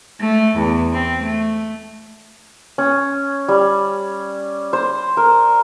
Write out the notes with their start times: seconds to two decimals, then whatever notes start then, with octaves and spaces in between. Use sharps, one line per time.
0.20 A3
0.57 E2
0.93 C4
1.22 A3
2.78 C#4
3.48 G3
4.73 C5
5.17 A#4